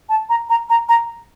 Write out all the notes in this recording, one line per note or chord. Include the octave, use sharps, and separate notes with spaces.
A5
A#5
A#5
A#5
A#5